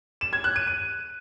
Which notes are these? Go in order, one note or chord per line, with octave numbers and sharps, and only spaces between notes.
E7
G#6
F#6
D#7
D#7